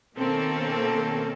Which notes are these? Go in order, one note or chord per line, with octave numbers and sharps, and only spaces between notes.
B2 D#3 A#3 C4 C#4 A4